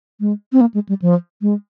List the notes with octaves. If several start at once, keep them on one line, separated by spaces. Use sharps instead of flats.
G#3
C4
A#3
G#3
G3
F3
G#3